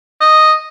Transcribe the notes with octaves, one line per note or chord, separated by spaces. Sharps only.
D#5